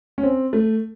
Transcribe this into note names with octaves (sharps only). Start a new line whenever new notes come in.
C#4
C4
A3